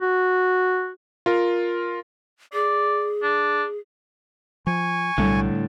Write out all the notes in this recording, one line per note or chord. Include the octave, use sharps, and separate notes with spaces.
F#4
F4 A#4 F5
G#4 D5
D4
F3 G#5 C#6
B1 A2 D3 G3 A3